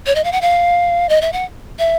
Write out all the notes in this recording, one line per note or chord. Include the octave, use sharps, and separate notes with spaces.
C#5
D#5
F5
F#5
F5
D#5
E5
F#5
E5